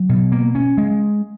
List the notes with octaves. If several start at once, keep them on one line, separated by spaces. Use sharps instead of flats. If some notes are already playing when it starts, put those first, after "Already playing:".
Already playing: F#3
B2
A#3
C#4
G#3